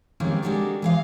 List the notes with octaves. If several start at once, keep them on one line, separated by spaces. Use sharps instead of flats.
D#3 G3 G#3 A#3 C4 C#4
G#3 A#3 D4 F#4 G4 A4
E3 G#3 F5